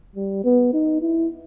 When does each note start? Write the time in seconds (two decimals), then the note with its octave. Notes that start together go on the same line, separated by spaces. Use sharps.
0.16 G3
0.44 B3
0.73 D#4
1.02 E4